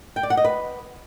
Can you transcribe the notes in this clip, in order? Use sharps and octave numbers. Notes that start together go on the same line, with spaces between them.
G5
D5
F#5
D#5
B4